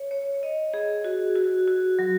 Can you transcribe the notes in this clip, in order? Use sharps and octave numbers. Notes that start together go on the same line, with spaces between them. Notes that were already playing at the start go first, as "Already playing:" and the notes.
Already playing: C#5
C#5
D#5
G#4
F#4
F#4
F#4
F#3